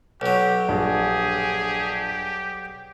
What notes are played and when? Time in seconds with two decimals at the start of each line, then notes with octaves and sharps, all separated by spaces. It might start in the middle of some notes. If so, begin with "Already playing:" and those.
0.21 B1 F#3 G4
0.69 A#1 G2 G4 G#4